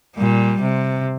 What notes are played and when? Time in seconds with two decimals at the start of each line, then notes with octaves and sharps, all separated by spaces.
0.16 A#2 G3
0.62 C3